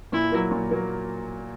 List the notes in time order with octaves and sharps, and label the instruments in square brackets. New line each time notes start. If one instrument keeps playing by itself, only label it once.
[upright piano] A#2 [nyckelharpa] E4
[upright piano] F#3 A#3
A#2
F#3 A#3